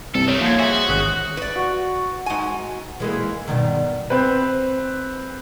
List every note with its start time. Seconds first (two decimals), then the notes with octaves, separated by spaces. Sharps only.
0.15 C2 G2 C3 A4
0.28 D#3 A3 C#5
0.41 G#2 F3 A#3 C5 G#6
0.59 F#4 G#4 C5 E5
0.89 A1 G#2 D#3 C#6 D#6 F#6 B6
1.37 B4 D5
1.56 F#4
2.26 G#2 G#5
3.00 E3 G#3 A#3
3.48 G2 B2 D#3
4.10 C4 B4